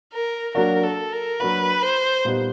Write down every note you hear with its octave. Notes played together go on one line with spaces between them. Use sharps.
A#4
F#3 A#3 D4 F#4 A#4
A4
A#4
F#3 A#3 D4 F#4 B4
C5
A#2 G3 B3 D#4 G4